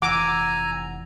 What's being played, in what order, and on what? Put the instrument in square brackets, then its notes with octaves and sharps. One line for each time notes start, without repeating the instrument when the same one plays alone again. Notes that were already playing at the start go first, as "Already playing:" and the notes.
[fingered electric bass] F1 E3 [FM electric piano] F#5 E6 [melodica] G#5 A#5 [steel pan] D6